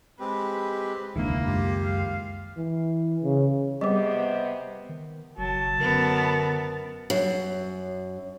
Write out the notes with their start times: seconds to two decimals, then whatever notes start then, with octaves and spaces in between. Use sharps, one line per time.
0.20 G#3 C4 G4 B4
1.16 E1 C#2 D#3 A3 A#3 D4 E4
1.46 F#2 G#3 F4 G4
1.84 F5
2.57 E3
3.23 C#3
3.81 C3 G3 B3 G#4 D#5 D6
4.89 D#3
5.38 F#1 F#3 A5
5.79 F#2 D3 B3 A#4
7.10 F#2